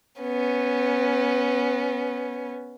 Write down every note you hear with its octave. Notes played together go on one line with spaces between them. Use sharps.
B3 C#4